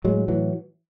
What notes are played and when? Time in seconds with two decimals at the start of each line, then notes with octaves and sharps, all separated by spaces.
0.04 A2 F#3 G#3
0.28 A2 E3 F#3